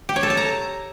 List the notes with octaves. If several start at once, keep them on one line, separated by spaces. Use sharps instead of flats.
G4
C#5
A4
A5
A#5